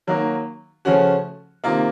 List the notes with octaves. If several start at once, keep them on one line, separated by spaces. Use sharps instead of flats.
D#3 F#3 A#3
C#3 F3 A3 C#4 F#4
C3 D#3 A#3 F4